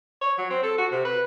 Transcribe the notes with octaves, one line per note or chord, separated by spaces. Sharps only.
C#5
F#3
C4
A4
F#4
C3
B4